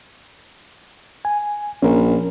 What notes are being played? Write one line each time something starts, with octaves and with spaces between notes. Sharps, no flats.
G#5
A#1 C#4 A#4